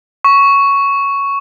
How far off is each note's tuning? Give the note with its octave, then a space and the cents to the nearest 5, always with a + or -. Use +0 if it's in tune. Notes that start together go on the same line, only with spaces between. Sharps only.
C#6 +5